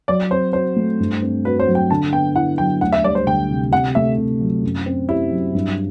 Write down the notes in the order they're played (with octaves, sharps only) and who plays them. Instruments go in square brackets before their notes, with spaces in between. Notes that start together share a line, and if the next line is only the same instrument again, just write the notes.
[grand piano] F#3 [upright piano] D5
[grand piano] C4 [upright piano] C5
[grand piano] F#4 [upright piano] C5
[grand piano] A3
G2
C4
[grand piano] F#4 [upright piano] B4
[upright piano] C5
[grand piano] F#3
[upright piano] G5
[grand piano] D3 [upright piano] A5
[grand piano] B3 [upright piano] G5
[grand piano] E4 [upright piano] F#5
[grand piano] F#3 [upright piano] G5
[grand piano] D2 [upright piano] F#5
[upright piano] E5
[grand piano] G3 [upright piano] D5
[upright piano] C5
[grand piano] D2 [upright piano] G5
[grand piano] C3
[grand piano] C3 [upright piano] F#5
[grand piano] A3 [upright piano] E5
[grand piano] C3
F#3
F#2
C4
[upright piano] E4 [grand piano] G4
[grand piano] F#3
G2